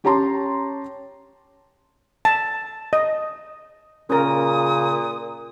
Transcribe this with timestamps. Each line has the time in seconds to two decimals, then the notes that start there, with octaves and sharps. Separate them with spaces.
0.04 C#4 G4 C#5 A5 A#5 C6
2.25 A5
2.93 D#5
4.10 A#2 C#3 C#4 A#4 D#6